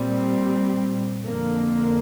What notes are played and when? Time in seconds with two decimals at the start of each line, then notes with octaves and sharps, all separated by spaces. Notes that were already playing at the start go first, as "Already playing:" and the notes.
Already playing: A#2 G3 C4
1.26 F2 D3 A#3